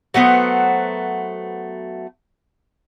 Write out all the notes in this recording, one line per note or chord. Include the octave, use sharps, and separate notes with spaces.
F#3 A3 B3 C5